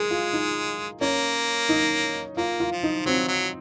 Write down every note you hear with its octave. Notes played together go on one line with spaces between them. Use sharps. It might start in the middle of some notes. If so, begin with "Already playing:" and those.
Already playing: G#3 G#4 A#4
F4
D#4
A#3 C#4
D#4
A#3 F4
F4
F3
D#4
F#3 C4
F#3